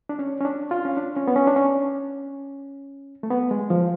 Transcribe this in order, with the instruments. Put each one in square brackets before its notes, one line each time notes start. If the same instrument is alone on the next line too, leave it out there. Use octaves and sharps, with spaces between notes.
[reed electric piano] D4
C#4
C#4
D4
F4
C#4
D4
C#4
B3
C#4
D4
C#4
A3
B3
G#3
F3